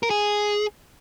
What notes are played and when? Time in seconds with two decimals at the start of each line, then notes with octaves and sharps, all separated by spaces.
0.03 A#4
0.10 G#4